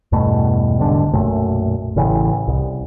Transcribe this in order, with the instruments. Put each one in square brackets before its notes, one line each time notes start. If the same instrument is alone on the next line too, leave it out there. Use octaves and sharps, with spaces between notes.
[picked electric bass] E2 G2 B2 A3
E1 C2 G#2 D3
B1 F#2 A#2 A3
A1 C#3 E3
C2